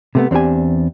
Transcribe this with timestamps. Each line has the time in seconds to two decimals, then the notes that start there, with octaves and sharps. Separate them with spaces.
0.15 C3 A3 B3
0.31 E2 C4 D4 G4 G#5